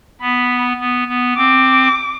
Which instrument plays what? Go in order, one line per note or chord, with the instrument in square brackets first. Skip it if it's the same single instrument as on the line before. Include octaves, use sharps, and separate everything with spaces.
[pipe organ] B3 [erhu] B5
[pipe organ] B3
B3
[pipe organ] C4 [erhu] D6